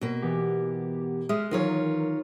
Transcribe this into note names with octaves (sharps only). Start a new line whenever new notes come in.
B2 A#3
E3 B3 G4
G#3 E5 D#6 F6
D#3 E3 F#3 F4 A#4 C#5